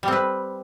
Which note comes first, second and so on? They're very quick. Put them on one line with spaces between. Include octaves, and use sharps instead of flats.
G3 C4 B4